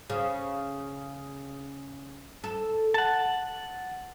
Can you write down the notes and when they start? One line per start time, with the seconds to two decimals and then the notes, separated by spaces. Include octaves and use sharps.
0.10 C#3
2.44 A4
2.94 F#5 A5